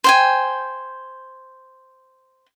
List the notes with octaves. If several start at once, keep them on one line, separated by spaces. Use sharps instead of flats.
C5 G5 G#5